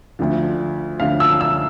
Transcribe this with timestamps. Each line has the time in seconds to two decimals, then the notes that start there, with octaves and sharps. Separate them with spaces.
0.19 D2 D3 F3
1.00 D2 D3 F3 F5
1.20 E6
1.41 E6